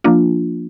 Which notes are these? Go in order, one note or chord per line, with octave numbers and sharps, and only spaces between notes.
F3 A#3 D4 F4